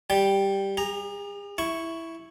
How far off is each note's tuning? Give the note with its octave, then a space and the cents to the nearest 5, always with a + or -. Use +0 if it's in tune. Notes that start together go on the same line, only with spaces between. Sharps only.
G3 +0 G5 +0
G#4 -45 A#5 +0
E4 +0 C#6 +0